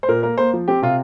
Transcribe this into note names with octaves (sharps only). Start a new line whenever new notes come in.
C5
A#2 A#4
A#3 A#4
A#3 C5
F3
C4 G4
C3 F4